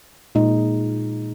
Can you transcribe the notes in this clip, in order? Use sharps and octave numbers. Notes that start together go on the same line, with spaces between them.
A#2 G#3 D#4